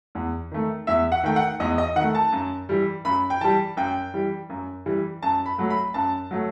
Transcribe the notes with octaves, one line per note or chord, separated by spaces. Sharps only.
E2
D#3 A3
E2 E5
F#5
D#3 A3 G5
F#5
E2 D#5
D#5
D#3 F#5
A3
A5
F#2
E3 G3
F#2 B5
G5
E3 G3 A5
F#2 G5
E3 G3
F#2
E3 G3
F#2 A5
B5
F#3 A3
B5
F#2 A5
F#3 A3